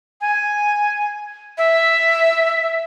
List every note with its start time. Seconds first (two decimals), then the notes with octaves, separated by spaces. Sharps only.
0.21 G#5
1.58 E5